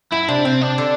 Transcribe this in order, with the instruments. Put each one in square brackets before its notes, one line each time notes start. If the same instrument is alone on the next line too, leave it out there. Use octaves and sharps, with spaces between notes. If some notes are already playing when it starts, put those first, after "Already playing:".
[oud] F#2 [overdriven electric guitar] E4
[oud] C3 [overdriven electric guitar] D4
[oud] C3 [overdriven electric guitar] C4
[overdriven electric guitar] D4
[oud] D3